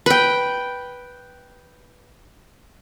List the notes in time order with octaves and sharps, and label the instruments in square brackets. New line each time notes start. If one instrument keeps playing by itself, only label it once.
[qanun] B4 G5